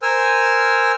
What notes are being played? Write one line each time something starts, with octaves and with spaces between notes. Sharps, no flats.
A#4 C5 G#5 E6 F6